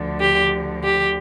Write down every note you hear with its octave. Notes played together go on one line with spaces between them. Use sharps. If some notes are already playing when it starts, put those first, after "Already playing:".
Already playing: D2 D3 F3
G4
G4